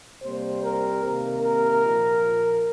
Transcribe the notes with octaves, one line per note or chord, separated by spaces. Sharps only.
C3 G3 A#3 C5
A#4
C3 D#3 A#3 A#4
A#4
A#2 F3 A#3